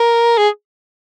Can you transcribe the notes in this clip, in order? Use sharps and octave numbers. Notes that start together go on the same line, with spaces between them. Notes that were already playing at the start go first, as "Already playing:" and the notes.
Already playing: A#4
G#4